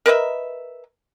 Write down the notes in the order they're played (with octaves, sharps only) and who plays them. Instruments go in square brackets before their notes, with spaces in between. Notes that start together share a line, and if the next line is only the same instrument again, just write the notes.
[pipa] A#4 B4 D#5 E5